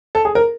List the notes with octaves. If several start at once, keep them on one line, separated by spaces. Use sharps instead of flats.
A4
G#4
A#4